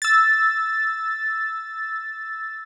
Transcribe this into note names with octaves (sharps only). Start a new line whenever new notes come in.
E6 A6